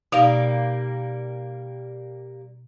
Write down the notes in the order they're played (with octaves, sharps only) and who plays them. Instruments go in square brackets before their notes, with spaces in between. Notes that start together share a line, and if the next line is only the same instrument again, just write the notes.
[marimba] B2 D#4 F5 [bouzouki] G3 A#3